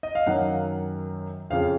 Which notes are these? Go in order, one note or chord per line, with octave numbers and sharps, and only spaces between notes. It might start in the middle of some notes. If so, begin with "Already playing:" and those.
D#5
F5
F#2 D#3 F#3 F#5
F2 C#3 F3 F5